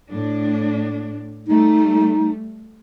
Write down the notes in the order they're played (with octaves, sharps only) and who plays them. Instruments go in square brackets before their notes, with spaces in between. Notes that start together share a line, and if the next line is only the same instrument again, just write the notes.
[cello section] A2 D4
[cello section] G3 A3 [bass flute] D#4